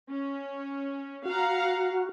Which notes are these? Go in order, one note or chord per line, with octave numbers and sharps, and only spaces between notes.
C#4
F#4 F5 F#5 A#5